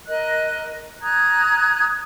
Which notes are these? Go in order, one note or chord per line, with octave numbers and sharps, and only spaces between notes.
A#4 D#5 F#6
A#5 D#6 F#6 G#6